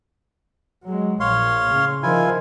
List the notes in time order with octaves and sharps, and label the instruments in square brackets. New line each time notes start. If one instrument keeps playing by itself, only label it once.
[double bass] F#3 G#3
[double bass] A#1 A#2 [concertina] C#5 F5 C6
[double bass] A2 C#3
[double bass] D#3 F3 [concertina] E4 F4 G#5